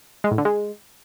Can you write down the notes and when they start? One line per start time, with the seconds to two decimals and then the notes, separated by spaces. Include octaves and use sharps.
0.24 G#3
0.31 A2
0.38 D3
0.45 G#3